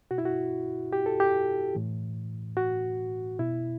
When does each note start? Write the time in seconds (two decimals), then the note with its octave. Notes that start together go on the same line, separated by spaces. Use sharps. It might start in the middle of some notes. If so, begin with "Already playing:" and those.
0.11 B2 F#4
0.18 E4
0.25 F#4
0.93 G4
1.06 A4
1.20 G4
1.75 A2 E3
2.57 F#4
3.39 B2 E4